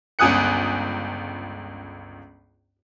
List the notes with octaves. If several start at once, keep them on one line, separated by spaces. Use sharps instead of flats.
G1 C#2 G#5 D#6 F#6 C#7